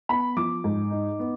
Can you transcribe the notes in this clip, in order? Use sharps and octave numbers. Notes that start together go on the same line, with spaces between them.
B3 B5
F3 D6
G#2
D#4
B3